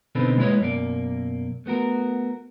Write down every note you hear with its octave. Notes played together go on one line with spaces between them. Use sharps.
B2 D3 C4 D#4 A4 B4
G#3 A#3 E4 B4 C#5 D#5
F#2 B2 A#3 D5
A3 B3 F#4 A#4